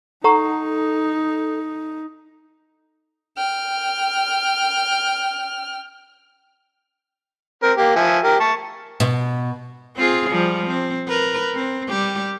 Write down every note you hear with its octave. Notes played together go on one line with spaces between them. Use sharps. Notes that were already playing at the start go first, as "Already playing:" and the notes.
D#4 A4 F#5 A#5 C#6
G5 F6
C4 A#4
A#3 G4
F3 E5 G#5
G4 A#4
A5 C#6
B2
C4 F4 G#4
F3 G3
C4
A#4 B4
C4
G3 G4